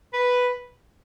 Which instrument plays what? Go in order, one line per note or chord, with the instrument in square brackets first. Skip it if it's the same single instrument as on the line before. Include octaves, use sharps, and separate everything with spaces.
[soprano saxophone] B4